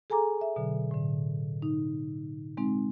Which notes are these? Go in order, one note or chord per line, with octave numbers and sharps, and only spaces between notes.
G#4 A4 G#5 A#5 D6
E5
B2 D3 F#3
A2 D3
D#4
G#3 C4 D#4